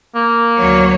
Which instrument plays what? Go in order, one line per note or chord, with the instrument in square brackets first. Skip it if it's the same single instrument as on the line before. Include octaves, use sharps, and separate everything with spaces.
[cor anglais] A#3
[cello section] D2 F#3 C#5